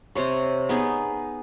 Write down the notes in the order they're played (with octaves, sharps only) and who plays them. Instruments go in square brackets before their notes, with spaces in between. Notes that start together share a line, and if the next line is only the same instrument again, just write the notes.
[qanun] C3 C5 C#5
B3 D#4 G#4